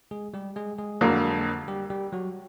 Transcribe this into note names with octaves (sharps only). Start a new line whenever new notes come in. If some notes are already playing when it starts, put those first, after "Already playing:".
G#3 G#4
G3 G4
G#3 G#4
G#3 G#4
F2 D3 F#3 A#3
G3 G4
G3 G4
F#3 F#4